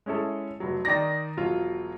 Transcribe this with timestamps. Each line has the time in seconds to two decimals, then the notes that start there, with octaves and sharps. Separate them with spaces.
0.06 G#3 C#4 E4 A4
0.60 F1 F#3
0.85 D#3 D#4 D5 A#6
1.37 E1 F#3 F4